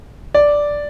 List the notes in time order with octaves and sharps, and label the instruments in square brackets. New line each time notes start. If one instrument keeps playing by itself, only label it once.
[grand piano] D5